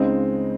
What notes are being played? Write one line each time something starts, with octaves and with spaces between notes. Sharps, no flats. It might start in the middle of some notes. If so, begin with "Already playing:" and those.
Already playing: C#2 C#3 G#3 C4 D#4